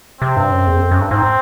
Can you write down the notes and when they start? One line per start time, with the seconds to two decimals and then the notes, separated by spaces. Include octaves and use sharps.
0.21 C3 C4
0.37 G2
0.51 F#2
0.67 E2
0.76 F#2
0.82 F2
0.91 F#2
1.01 G2
1.11 G#2 C4